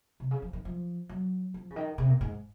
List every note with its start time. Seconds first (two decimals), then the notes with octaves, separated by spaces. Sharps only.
0.20 C3
0.31 C#3
0.42 F3
0.53 D#3
0.65 F3
1.09 F#3
1.54 F3
1.70 C#3
1.76 D#3
1.98 C3
2.09 A#2
2.21 G#2